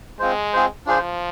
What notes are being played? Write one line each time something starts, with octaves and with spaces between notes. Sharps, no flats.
G#3 C4 F4 C5
C4 F4 G#4 C5
F3 D4 F4 G#4 C5